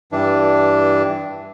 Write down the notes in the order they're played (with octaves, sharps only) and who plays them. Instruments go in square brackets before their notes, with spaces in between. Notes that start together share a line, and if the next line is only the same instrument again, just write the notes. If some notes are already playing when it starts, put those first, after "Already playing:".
[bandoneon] G2 E3 D4